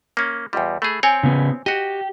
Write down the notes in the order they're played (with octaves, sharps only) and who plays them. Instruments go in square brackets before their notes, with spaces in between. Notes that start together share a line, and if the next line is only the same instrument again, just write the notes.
[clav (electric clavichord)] A#3 C#4
[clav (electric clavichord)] E2 G3 [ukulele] F4 D#5 G5
[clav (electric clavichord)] A3 G#4 [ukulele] B5
[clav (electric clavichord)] C4 C#5 G5 [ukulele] C5 G#5
[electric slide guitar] C#3 B3
[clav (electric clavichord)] F#4 D#5 [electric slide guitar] G4